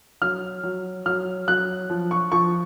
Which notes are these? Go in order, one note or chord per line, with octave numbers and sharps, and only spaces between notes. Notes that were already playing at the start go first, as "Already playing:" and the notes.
F#3 F6
F#3
F#3 F6
F#3 F#6
F3
C#6
F3 C#6